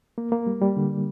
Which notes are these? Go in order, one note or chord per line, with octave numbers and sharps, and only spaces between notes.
A#3
A#3
G3
G3
D3